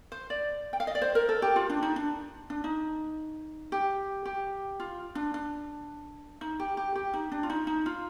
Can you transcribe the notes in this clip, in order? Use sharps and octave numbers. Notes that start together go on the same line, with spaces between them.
C5
D5
G5
F5
D#5
D5
C5
A#4
A4
G4
F4
D4
D#4
D4
D4
D#4
G4
G4
F4
D4
D4
D#4
G4
G4
G4
D#4
D4
F4
D#4
D#4
F4